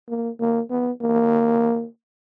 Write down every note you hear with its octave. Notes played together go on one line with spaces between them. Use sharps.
A#3
A#3
B3
A#3